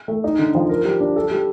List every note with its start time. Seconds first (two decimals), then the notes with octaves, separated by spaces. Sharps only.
0.08 A3
0.24 D#4
0.39 D3
0.55 F3
0.69 A#4
0.85 G3
1.00 D4
1.16 A4
1.31 G3